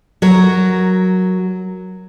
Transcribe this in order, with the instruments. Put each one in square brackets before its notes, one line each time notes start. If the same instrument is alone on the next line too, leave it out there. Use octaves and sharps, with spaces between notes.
[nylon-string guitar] F#3 A#4